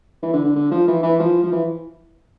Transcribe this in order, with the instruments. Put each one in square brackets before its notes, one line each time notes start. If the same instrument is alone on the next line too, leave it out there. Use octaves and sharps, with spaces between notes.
[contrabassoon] E3
D3
D3
D3
F3
E3
E3
F3
F3
E3